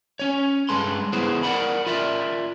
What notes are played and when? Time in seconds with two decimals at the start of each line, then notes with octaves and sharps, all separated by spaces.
0.19 C#4 C#5
0.69 G2 G#3 A4 B4 C6
1.13 B3 E4 G#4 B4 C5
1.43 A#4 D5 D#5 F#5 B5
1.86 F4 A#4 D5 E5